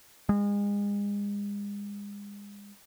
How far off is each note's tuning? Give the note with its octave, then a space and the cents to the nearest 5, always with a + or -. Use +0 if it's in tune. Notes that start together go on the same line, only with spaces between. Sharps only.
G#3 -35